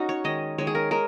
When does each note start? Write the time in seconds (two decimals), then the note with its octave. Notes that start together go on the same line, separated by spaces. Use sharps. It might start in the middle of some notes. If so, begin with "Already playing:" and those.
Already playing: C#4 D#4 F#4
0.09 C#5
0.24 D#3 G#3 D#5
0.58 D#3 G#3 C#5
0.67 G#4
0.75 A#4
0.91 G#3 A#4